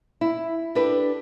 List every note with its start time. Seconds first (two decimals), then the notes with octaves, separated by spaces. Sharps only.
0.21 E4
0.75 D4 G4 A4 B4